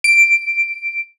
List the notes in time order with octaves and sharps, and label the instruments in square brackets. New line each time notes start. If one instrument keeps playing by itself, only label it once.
[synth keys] D7